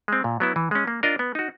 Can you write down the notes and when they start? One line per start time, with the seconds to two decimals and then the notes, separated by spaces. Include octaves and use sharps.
0.08 G#3 C4
0.24 A#2
0.40 F#3 B3 E4
0.56 E3
0.71 G#3 C#4
0.87 A#3
1.03 D4 F4 A#4 D#5
1.19 B3
1.35 D#4 F#4